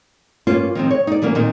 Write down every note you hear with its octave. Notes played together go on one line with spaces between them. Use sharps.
G2 A#3 C#4 F4
D#3 F3 C4
C#5
D#4 D5
E3 F#3 A#3 C#4
A#2 D#3 F#3 C4 D#4